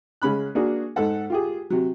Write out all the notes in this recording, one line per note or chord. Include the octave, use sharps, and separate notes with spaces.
C#3 G#3 C#4 B5 F#6
A#3 D4 F#4 G#4
G#2 D#4 A4 F#5
F4 G4 G#4
C3 F#3